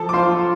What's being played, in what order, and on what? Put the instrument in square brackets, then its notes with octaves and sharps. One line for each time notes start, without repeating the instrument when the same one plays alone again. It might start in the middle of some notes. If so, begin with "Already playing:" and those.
Already playing: [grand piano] F3 [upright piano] A4 A5
[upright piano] D6
[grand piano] F4 [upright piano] C5 C6